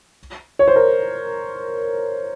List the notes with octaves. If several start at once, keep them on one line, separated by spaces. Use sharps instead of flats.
C#5
C5
A#4